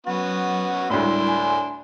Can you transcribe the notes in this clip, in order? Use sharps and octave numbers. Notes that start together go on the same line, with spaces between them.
F#3 B3 C#4 F#4 F#5
D2 A2 G3 G#3 D4 E4 C6
G#5